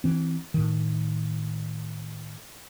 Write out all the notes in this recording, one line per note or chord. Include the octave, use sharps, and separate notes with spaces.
E3 C4
A2 D#3